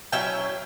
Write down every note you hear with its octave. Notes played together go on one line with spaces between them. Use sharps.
F#3 C#4 E4 E5 G5